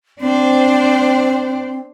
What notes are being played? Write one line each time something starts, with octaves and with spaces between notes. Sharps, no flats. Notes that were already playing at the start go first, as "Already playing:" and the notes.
C4 D4 C5